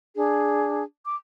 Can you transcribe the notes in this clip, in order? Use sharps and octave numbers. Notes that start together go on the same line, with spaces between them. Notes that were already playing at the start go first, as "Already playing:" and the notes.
D4 G#4
D6